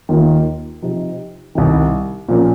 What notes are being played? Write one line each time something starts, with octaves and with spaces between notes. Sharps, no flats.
D#2 D#3 A#3 F4
C3 F3 C4 D#4
C2 C3 D#3
A#2 F3 A#3 C#4